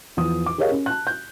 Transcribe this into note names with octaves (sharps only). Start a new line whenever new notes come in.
E2 F3 D#6
D6
G4 G#4 A#4 C#5 D#5 F5
C#4
A5 F#6
G6